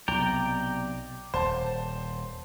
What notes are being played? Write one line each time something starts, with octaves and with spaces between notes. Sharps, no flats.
B1 C3 D5 G5 A#5
D#1 C5 A5